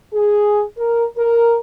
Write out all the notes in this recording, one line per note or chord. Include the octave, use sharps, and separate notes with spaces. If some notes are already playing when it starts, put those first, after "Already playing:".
G#4
A#4
A#4